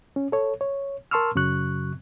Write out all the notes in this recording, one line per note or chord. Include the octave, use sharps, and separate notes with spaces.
C#4
A4 C#5
C#5
A#4 A5 C6 C#6 E6 F6
F#2 C#3 F#3 C#6 F#6